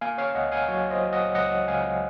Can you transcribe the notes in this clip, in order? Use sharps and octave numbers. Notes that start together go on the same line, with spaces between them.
A#3 F5 G#5
C#5 F5
C#2 D#5 F#5
F5 G#5
F#3 C#5
C5 D#5
F#3
D#5 F#5
C#2 D#5 F#5
C#2 F5 G#5